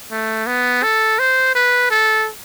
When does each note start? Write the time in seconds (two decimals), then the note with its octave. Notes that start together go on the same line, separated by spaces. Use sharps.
0.11 A3
0.47 B3
0.83 A4
1.19 C5
1.55 B4
1.91 A4